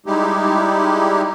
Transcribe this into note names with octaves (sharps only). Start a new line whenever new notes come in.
G3 G#3 D#4 E4 G4